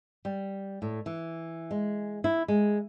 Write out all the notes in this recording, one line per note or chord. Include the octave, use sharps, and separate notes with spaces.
G3
A2
E3
G#3
E4
G#3